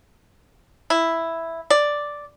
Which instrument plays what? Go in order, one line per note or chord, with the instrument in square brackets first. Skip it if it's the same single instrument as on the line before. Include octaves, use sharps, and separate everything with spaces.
[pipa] E4
D5